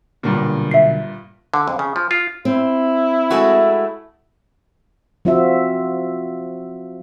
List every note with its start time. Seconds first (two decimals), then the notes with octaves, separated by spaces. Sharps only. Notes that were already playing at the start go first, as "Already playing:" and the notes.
0.23 B1 G2 A#2 D3 A#3
0.71 E5 C7
1.54 D3
1.68 F2
1.79 C#3
1.96 F3
2.11 F4
2.45 C4 E4
3.31 G#3 A3 F#4
5.25 F3 C4 F4 F#4 E5